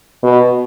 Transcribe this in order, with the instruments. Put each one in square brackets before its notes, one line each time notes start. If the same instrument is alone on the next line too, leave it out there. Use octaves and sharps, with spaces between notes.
[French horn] B2